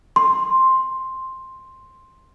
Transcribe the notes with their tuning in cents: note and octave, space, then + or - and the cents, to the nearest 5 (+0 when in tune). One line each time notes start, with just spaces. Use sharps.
C6 +5